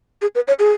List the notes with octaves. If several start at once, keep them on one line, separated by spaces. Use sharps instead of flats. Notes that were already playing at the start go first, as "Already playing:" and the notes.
G#4
B4
C#5
G#4